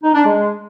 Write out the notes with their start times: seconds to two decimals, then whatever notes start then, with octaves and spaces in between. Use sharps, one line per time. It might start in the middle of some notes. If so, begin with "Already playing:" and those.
0.03 D#4
0.14 D4
0.25 G#3